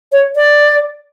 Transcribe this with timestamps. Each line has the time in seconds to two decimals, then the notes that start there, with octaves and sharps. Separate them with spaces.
0.12 C#5
0.36 D5